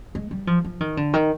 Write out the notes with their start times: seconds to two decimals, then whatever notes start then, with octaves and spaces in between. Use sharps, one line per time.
0.15 G#3
0.31 G3
0.47 F3
0.64 F3
0.81 D#3
0.97 D3
1.13 D#3